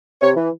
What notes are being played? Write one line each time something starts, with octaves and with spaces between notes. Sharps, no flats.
C3 C#5
E3